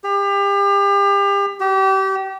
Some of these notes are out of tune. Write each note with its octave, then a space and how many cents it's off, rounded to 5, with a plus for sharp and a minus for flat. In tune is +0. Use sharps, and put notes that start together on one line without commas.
G4 +30
G4 -30